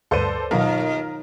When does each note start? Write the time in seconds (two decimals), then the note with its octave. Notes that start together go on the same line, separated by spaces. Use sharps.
0.11 D2 G2 A4 B4 C5 D5 D#7
0.51 D#2 B2 F#3 B3 F4 A#4